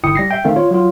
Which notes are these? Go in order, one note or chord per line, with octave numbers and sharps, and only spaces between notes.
G1 E4 G5 D#6 C#7
G3 A#6 C7
E5 G5
D#3 A3 C4 F5
F4 C#5
F#3 F4